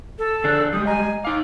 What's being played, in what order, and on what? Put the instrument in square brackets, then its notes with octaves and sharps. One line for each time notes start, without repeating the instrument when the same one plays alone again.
[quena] A4
[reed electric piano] D3 F#6 [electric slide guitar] D4 G#4
[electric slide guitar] G3 G#3 [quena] D#6
[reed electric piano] D#5 A#5 [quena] G#5
[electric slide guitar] D#4 F5 [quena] D6